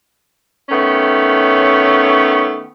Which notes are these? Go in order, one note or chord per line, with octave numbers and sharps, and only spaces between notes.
D#3 A3 B3 C#4